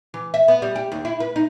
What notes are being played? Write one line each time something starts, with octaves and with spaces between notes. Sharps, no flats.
E3
E5
B3
G3
G4
D#2
E4
B4
D#4